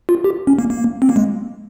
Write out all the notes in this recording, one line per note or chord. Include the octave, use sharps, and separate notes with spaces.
F4
G4
C#4
A#3
A#3
C4
A#3
G#3